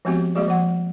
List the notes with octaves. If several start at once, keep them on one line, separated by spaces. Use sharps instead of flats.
F3 G#3 B3 C4 F#4 G4
G3 G#3 A#3 F#4 G#4 D5
F3 F#5